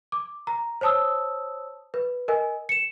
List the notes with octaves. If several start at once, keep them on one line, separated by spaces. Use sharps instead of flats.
D6
A#5
C5 C#5 A5 D#6 E6
B4
A#4 D#5 G#5
C#7 E7